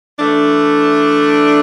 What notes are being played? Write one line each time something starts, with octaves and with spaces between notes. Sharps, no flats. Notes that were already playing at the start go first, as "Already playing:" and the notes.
E3 A3 D4